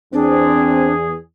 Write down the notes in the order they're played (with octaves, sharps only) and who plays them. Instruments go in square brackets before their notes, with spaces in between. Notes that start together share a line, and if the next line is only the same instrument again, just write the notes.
[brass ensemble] E2 G#4 [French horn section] C4 [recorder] D4